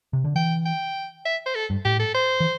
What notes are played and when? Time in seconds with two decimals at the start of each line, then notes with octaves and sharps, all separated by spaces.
0.13 C3
0.24 D3
0.36 E3 G5
0.66 G5
1.26 E5
1.46 C5
1.55 A4
1.70 G2
1.85 A2 G4
2.00 A4
2.15 C5
2.40 E3